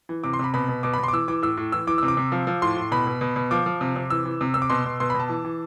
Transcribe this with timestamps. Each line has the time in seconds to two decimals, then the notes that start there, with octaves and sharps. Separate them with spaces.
0.09 E3
0.24 C3 D6
0.33 C6
0.39 C3 B5
0.54 B2 B5
0.68 B2
0.83 B2 D6
0.94 B5
0.98 B2
1.03 C6
1.08 D6
1.13 E3 E6
1.28 E3 D6
1.42 A2 E6
1.57 A2
1.72 E3 E6
1.87 E3 D6
1.98 C3 E6
2.08 D6
2.17 C3
2.32 F3
2.47 F3
2.62 A2 C6
2.77 A2
2.92 B2 B5
3.07 B2
3.21 B2
3.36 B2
3.51 F3 D6
3.66 F3
3.81 C3
3.96 C3
4.10 E3 E6
4.25 E3
4.41 C3
4.54 C3 E6
4.62 D6
4.70 B2 C6
4.85 B2
5.00 B2 C6
5.10 B5
5.14 B2
5.20 A5
5.29 E3
5.45 E3